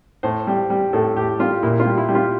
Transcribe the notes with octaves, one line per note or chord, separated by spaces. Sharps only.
A2 C5
G3
G3
A2 A4
A2 G4
G3 F4
A#2 E4
F4
G3
E4
G3
F4